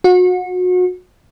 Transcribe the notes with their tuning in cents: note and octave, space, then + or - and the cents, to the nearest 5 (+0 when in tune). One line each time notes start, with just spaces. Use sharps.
F#4 -30